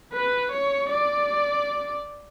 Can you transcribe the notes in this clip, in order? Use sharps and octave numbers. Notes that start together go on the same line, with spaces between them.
B4
C#5
D5